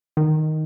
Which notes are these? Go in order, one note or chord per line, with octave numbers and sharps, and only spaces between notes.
D#3